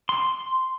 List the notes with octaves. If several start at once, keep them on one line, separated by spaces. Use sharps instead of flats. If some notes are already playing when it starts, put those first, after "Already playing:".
C6